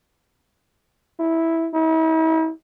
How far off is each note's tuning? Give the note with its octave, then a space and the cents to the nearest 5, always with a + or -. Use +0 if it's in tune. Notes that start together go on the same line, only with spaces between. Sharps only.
E4 -10
E4 -45